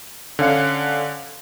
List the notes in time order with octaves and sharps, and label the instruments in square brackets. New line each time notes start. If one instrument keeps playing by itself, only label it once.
[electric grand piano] D3 C#4 F5 C#7